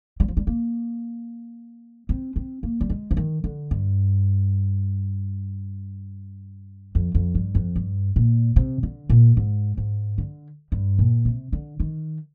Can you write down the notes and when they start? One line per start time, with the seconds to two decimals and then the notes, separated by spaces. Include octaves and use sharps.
0.20 G3
0.28 F3
0.37 G3
0.47 A#3
2.09 C4
2.36 C4
2.63 A#3
2.81 G3
2.90 G#3
3.11 F3
3.17 D#3
3.44 D3
3.71 G2
6.95 F2
7.15 F2
7.35 G2
7.55 F2
7.76 G2
8.16 A#2
8.56 C3
8.83 D3
9.10 A#2
9.37 G#2
9.77 G#2
10.18 D3
10.72 G2
10.99 A#2
11.25 C3
11.53 D3
11.80 D#3